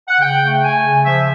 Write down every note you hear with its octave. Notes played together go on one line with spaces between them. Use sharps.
F#5
C#3 G5
A3
A3 G#5
C#3
F3 E5